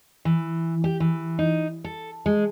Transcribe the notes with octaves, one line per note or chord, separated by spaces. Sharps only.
E3
G4
E3
D#4
A4
G#3